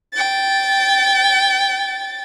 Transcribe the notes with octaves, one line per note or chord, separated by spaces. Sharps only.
G5 A6